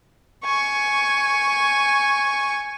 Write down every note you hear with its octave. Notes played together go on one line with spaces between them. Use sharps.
G#5 C#6